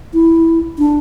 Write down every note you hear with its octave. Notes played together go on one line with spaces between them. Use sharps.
E4
D4